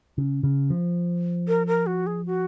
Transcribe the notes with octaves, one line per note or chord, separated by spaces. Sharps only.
C#3
C#3
F3
A#4
A#4
F#4
G#4
F#4